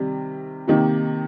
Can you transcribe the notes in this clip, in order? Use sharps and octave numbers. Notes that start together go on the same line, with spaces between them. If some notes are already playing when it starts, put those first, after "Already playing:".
Already playing: C3 D#3 G3
C3 D#3 A#3 D#4 G4